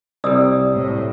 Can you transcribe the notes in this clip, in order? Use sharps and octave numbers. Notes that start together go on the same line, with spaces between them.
C2 G3 D5 D#6 E6
A2